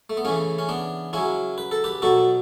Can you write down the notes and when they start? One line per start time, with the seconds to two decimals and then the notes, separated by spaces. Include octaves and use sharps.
0.10 A3
0.17 B3
0.25 C#3 E3 A3 C#4
0.58 C#4
0.69 B3 D4
1.13 C#3 F#3 C#4 E4
1.58 B4
1.71 A4
1.84 G4 B4
2.02 B2 F#3 F#4 A4